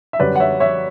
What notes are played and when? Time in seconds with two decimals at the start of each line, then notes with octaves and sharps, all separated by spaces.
0.13 E5
0.19 F#2 D3 G3 C#4 B4 D5
0.36 F#5
0.40 C#5 E5
0.60 C#5 E5